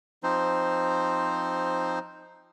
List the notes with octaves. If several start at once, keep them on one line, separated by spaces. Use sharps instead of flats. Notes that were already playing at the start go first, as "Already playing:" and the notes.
F3 C4 D#4 C5